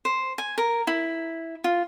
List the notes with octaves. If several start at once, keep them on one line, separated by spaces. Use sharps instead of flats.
C5
G#5
A#4
E4
F4